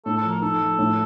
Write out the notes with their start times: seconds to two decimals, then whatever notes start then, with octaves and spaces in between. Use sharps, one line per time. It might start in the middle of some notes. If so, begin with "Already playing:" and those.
0.05 A2 A4
0.17 A4
0.24 F3
0.29 A#4
0.42 D#4 A4
0.60 F3
0.78 A2